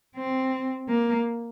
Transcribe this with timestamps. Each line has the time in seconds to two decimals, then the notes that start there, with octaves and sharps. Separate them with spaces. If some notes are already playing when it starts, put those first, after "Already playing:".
0.16 C4
0.89 A#3